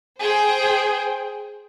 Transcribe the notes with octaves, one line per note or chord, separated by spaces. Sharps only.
G#4 C5 G5